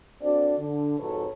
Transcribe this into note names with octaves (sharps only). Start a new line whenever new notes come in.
C4 D4 F#4 A4 D5
D3
F2 G#2 F#4 A4 B4 C#5